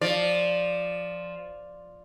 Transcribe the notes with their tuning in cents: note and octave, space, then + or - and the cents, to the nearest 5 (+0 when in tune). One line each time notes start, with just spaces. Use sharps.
F3 +0 D5 +0